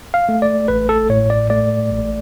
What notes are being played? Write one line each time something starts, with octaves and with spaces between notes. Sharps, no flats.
F5
A3
D5
A1 B4
A4
A2 C#5
D5
A3 D5
A1